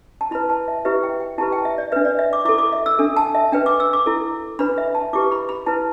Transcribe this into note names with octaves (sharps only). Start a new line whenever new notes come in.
A5
E4 B4 B5
A5
E5
E4 G4 B4 E5
G5
G5
E4 G4 B4 A5
G5
E5
D5
D4 B4 E5
D5
E5
D6
E4 A4 D6
D6
E5
E6
D4 A4
A5
E5
D4 B4 G5
D6
E6
D6
E4 A4
D4 B4 B5
E5
A5
E4 G4 B4 D6
B5
B5
E4 B4 A5